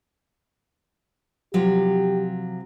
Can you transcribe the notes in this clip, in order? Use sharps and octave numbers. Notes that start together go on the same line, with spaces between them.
C3 F3 F#3 G4